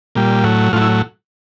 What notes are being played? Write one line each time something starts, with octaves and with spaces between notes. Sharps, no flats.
A#2 G3
A2 F#3
A2 F#3 F4
E4